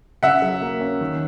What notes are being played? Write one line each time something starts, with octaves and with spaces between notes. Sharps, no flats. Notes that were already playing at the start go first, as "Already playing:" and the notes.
C#3 E5 F#5
F#3
A#3
C#4
D#3